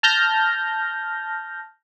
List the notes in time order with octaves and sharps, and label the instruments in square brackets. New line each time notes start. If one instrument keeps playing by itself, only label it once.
[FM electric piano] A5 F6 G6 A#6